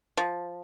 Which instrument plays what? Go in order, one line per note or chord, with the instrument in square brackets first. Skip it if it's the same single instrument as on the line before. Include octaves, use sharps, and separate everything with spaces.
[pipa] F3